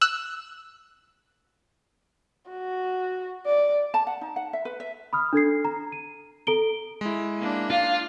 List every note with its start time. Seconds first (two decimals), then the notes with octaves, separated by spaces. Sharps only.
0.01 E6 F#6
2.50 F#4
3.46 D5
3.94 A5
4.07 F#5
4.21 D#4
4.36 F#5
4.53 E5
4.65 B4
4.80 E5
5.13 B5 D#6 F6
5.33 D4 A4 G#6 C7
5.65 A#5
5.92 D#7
6.47 A4 A#5 D7 G7
7.01 G#3 E4
7.39 A#3 D4
7.70 F4 F5